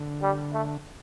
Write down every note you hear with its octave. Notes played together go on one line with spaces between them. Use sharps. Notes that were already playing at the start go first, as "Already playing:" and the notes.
Already playing: D3
G3
A3